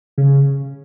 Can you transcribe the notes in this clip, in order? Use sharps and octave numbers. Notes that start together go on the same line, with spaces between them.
C#3